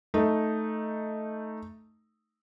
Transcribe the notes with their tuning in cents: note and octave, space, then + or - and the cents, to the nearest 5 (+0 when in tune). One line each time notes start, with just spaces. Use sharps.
A3 +0 D#4 +0